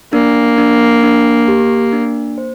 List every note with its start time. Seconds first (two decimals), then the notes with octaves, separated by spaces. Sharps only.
0.13 A#3 D4
0.58 D4
1.03 D4
1.48 G4
1.93 D4
2.38 C5